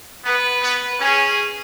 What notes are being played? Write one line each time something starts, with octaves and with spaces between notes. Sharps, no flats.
B3 B4
B3
C#4 G#4